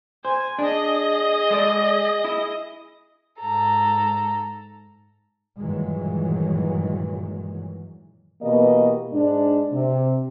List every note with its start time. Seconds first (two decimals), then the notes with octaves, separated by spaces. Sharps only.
0.25 C5 G#5
0.59 D4 G#4 D5 D#5
1.50 G#3 A4 D5
2.25 E4
3.40 G#2 A4 A#5
5.59 G2 A#2 D#3 E3 F#3 G#3
8.42 B2 E3 A#3 G4 D#5
9.12 G#2 G#3 D4
9.72 C3